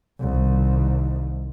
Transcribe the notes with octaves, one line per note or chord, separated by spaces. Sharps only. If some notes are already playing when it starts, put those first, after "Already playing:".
C2 D#3